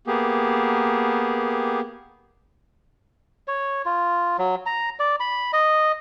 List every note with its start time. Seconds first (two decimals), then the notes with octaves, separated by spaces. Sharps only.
0.07 A#3 B3 G4 G#4
3.48 C#5
3.85 F4
4.39 F#3
4.66 A#5
4.99 D5
5.20 B5
5.53 D#5